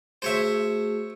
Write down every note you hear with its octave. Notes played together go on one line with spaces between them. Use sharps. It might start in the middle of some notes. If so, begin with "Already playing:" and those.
A3 F#4 G#4 C5 C#5 E5